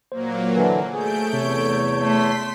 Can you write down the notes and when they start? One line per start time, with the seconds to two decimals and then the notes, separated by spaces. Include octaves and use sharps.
0.12 A#2 F#3 A#3 C5
0.52 D3 E3
0.93 A3 G#4 G6 D7
1.33 E2 C3 C#5
1.98 A3 C6 B6